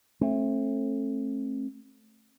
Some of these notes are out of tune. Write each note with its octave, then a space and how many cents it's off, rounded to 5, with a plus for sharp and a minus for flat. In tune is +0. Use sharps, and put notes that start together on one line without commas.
A3 +0 C4 +45